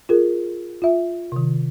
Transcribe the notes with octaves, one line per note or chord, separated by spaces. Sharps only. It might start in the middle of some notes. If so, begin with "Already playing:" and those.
F4 G#4 A#4
F4 E5
C3 D#3